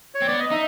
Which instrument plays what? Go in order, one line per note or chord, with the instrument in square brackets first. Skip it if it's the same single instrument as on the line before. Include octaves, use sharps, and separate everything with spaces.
[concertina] C#5
[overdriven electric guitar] C4
[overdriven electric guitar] B3 [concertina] D5
[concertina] D#5
[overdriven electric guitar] D#4 [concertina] E5